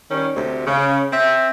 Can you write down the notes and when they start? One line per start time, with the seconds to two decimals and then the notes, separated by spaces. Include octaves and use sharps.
0.11 D#3 G3 C#4
0.35 D2 C3
0.66 C#3
1.13 C4 E5